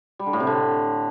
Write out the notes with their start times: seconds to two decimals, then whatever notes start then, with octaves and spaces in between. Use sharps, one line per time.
0.19 G3
0.26 D3
0.33 A2
0.40 C3
0.47 D3